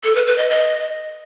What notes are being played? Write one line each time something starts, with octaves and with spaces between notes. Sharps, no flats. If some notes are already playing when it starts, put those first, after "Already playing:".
A4
B4
B4
D#5
D#5